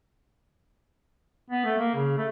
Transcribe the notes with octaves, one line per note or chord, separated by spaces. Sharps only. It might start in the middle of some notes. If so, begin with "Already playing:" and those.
B3
A3
A#3
C#3
A3